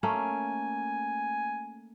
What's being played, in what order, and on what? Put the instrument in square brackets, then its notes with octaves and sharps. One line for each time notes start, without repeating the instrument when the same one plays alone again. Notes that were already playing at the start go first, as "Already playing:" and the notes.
[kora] A3 A#3 C#4 [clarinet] G#5